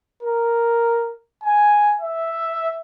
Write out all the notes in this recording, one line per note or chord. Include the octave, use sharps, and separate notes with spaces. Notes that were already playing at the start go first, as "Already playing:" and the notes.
A#4
G#5
E5